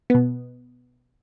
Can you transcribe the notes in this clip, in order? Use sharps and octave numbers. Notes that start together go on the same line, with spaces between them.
B2 B3